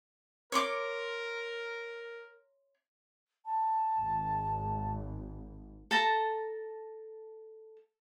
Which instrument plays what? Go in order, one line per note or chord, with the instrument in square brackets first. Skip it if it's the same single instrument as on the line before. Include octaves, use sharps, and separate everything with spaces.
[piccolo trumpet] A#4 [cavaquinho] C#5 C6 D6
[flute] A5
[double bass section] G#1
[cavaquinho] A4 A5 A#5